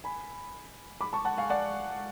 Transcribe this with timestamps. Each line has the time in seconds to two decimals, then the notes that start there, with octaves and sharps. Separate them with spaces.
0.04 G#5 B5
1.01 B5 D6
1.13 A5 C#6
1.25 F#5 A5
1.38 F5 G#5
1.50 D5 F#5